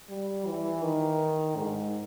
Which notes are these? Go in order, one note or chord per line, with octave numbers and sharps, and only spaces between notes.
G3
E3
D#3
G#2